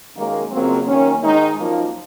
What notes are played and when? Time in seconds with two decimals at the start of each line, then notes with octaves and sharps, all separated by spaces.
0.16 F#2 D#3 G#3 A#3
0.51 F2 C#3 F#3 A#3 C4
0.86 F#2 D#3 A#3 C#4
1.22 G#2 D#3 G#3 D#4
1.57 F#2 F3 A#3 D#4